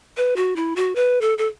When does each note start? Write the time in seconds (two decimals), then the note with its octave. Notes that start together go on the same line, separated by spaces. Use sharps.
0.17 B4
0.36 F#4
0.56 E4
0.76 F#4
0.96 B4
1.21 A4
1.38 A4